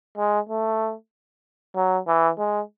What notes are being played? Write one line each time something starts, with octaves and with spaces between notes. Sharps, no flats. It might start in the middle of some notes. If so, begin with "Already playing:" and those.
G#3
A3
F#3
E3
G#3